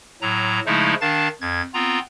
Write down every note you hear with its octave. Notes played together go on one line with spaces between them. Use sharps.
A2 F#3 A#5
C#3 F3 G#3 A3 D#4 E4
D#3 D4 F5 A5 A6
F2 G#6 A6
B3 C4 F4 A#5